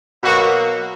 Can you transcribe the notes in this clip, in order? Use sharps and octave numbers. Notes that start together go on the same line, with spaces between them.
B2 F#3 A#3 F#4